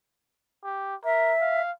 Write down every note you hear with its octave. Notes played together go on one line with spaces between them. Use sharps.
G4
A#4 E5
F5